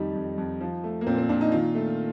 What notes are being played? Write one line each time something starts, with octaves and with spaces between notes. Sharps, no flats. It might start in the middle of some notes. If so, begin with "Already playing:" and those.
Already playing: F2 D#3 G3 D#4
F2
F2
F3
A3
A#3
A#2 C4
C4
A#2 D4
D#4
D#3 F4
A3